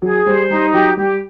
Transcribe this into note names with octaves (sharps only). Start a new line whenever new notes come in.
F#3 G#4
G3 C5
G3 D#4
F#3 G4
G3 G4